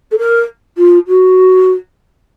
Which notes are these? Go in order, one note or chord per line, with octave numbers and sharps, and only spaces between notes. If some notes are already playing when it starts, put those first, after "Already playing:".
A4
A#4
F4
F#4